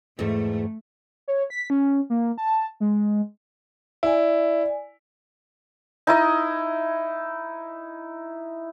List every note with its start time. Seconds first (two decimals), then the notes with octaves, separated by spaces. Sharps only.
0.19 E2 G#2 A3
1.28 C#5
1.50 B6
1.70 C#4
2.10 A#3
2.38 A5
2.80 G#3
4.03 E4 D5 G#5
6.07 D#4 E4 D#5